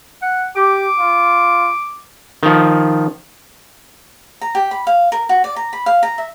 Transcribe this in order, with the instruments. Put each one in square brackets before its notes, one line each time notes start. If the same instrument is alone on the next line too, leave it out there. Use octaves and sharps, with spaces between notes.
[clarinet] F#5
[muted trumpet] G4 [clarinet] D6
[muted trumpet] F4
[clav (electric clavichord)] D#3 F3
[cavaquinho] A#5
G4
B5
F5
A#4
F#4
D5
A#5
B5
F5
A#5
E5